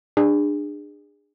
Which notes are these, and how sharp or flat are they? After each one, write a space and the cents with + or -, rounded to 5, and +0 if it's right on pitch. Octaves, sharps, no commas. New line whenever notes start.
D4 +25 G#4 -25